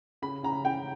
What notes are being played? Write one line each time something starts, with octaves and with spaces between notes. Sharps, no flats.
C#3 B5
C#3 A#5
C#3 G5